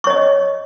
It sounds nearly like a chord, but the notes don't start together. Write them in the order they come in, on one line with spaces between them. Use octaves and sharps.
C#6 C#5 D#5